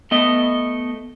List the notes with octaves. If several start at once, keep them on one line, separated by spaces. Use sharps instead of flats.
A3 B3 D#5